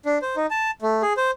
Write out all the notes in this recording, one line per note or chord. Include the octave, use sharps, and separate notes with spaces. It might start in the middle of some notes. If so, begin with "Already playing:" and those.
D4
C5
D#4
A5
A3
G#4
C5